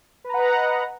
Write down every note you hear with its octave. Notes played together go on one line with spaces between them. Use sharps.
B4 D#5 F#5 A#5